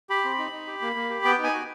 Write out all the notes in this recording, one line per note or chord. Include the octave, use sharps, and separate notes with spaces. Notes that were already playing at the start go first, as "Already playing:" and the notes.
G4 B5
C4
D#4
D#4
G4
A#3
A#3
G4
B3 G5
D#4
G#5
F#4